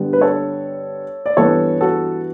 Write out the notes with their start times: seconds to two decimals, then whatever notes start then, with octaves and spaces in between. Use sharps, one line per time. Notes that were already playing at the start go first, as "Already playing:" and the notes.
Already playing: G2 D3 G3 B3
0.13 B4
0.21 A4 C#5
1.26 D5
1.37 G2 E3 B3 A4 C#5
1.81 F#4 A4